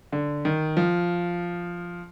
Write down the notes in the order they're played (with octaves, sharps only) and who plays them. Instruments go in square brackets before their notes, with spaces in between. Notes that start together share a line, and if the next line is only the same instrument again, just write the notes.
[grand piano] D3
D#3
F3